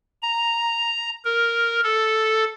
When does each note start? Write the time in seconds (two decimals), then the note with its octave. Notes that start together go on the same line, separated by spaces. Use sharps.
0.22 A#5
1.25 A#4
1.84 A4